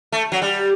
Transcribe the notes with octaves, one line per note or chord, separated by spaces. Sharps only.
A3
F#3
G3